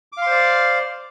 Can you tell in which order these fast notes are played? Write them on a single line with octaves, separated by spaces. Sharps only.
D6 F5 C6 C5 D5